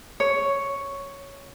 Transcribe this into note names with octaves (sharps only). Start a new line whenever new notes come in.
C#5